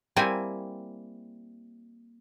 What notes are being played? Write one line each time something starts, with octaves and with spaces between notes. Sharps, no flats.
G3 A#3 C4 E4 G#5